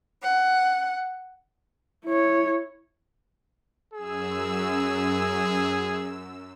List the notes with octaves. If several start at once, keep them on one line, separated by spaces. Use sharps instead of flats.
F#5
E4 C#5
F#2 G#4 E6